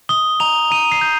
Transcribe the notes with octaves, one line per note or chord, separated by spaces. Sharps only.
D#6 G7
A#5 F7
A#5 D#7
C7
G6